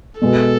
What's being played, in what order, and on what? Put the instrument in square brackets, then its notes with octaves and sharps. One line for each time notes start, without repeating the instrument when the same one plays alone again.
[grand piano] B2 G#3 B3 F#4 [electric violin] A4